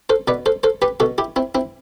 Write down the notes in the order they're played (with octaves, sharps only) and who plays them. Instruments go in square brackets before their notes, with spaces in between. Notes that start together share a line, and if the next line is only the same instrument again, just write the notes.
[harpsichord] A4 C5
B2 B4 D5
A4 C5
A4 C5
G4 B4
B2 F#4 A4
E4 G4
C4 E4
C4 E4